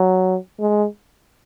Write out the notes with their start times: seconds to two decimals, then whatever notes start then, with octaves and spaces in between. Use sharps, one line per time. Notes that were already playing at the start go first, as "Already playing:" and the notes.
Already playing: F#3
0.60 G#3